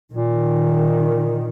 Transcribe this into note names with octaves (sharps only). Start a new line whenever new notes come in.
A#2 D#3